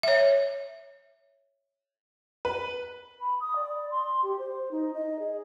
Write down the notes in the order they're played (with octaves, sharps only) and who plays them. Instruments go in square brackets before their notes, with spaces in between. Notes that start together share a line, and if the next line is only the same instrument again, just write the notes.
[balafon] C#5 E5
[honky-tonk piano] B4
[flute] B5
D#6
D5
C6
G4
C5
D#4
D#5
G#4